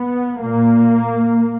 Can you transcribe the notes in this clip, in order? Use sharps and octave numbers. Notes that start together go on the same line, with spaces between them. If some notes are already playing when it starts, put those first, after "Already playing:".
Already playing: B3
A#2 A#3